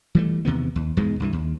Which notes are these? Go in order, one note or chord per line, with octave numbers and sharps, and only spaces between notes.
E3 G3 A3
E2 C3 D#3 B3
D#2
E2 G#2 B2 G#3
C2 G2 E3
D#2